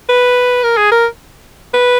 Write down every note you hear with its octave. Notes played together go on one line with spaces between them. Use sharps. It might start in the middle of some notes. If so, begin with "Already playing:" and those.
B4
A#4
G#4
A#4
B4